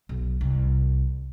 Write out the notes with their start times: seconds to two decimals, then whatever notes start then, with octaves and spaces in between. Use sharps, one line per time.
0.09 B1
0.41 C2